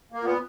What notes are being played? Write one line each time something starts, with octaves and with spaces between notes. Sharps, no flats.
A#3
A#2 B3